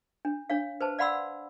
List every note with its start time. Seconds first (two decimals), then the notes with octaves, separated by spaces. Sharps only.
0.25 D4
0.50 D4 C#5 F5
0.81 B4 C5 A5
0.99 D5 F5 F#5 B5 C6 E6